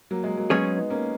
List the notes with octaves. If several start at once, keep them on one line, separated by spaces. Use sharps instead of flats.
F#3 A#3
G#3
F#3 A#3
F#3 G#3 B3 C#4 G#4 C#5
B3 D#4
A#3 C#4